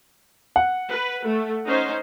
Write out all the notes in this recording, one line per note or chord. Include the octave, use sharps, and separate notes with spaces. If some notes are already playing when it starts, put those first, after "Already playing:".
F#5
B4
A3
C#4 D#4 C5